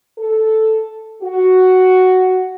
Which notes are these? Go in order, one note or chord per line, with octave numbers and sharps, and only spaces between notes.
A4
F#4